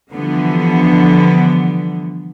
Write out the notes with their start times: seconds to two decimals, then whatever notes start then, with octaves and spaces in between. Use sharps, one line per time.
0.13 D3 E3 F3 G3 B3